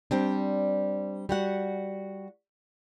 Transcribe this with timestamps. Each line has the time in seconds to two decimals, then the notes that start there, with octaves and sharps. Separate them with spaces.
0.11 G3 C4 D4
1.29 G3 F#4 F#5